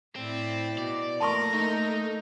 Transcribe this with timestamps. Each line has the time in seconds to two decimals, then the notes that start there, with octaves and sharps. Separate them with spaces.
0.16 A2 C4 E4 D5
0.78 B2 D5
1.21 A3 A#3 A#4 A5 C6 C#6
1.54 D#4